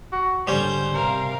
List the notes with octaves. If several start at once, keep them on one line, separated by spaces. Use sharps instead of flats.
F#4
G#2 D3 G3 C#4 C5 G6
C3 A#4 F5